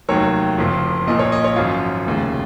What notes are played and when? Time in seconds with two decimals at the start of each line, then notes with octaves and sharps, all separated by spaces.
0.09 F1 D#2 D#3 F#3 C#5
0.58 F#1 F2 F3
1.07 A#1 A#2 F3 D#5
1.19 C#5
1.32 D#5
1.44 C#5
1.56 G#1 F#2 F3 F4
2.06 F1 D#2 C#3